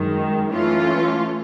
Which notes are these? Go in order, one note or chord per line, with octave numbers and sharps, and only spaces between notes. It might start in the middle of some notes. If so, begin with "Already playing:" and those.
Already playing: F#2 D#3 G#3
E3 A3 C#4 F4